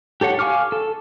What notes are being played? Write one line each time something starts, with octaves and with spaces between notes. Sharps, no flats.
G4 A4 C#5 F#5
F5 G#5 C#6 D6 F6
A4